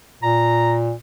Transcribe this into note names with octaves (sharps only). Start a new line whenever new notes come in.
A#2 A#5